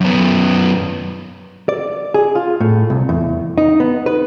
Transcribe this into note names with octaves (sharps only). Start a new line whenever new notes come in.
F#2 B3
D5
G#4
F4
A2
C2
E2
D#4
B3
B4